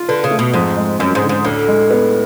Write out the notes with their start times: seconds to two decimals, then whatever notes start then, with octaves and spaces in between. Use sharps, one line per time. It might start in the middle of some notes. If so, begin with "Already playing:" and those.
Already playing: F4
0.09 D3 B4
0.24 C#3
0.31 A3
0.39 B2
0.54 F2 G#2
0.77 G#3
0.99 F#2 C#4
1.15 G#2
1.22 D3
1.29 G#2
1.45 D2 A2
1.68 G#3
1.91 B3